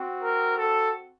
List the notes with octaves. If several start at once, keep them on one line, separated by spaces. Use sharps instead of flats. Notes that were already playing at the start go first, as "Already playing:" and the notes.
Already playing: C4 F#4
A#4
A4